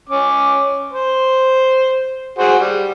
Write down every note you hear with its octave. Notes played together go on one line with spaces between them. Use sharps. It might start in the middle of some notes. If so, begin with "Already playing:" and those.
C#4 D6
C5
F#4 G#4 C5
G3